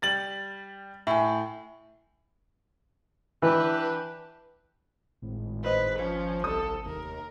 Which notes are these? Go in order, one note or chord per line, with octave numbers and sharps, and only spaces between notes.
G3 A6 F#7
A2 E5 G#5
E3 D4 G4 B4
G#1 A2
B4 C5 D#5
G#1 F3 C#4
C2 A4 D#6
F1 D#2 A#4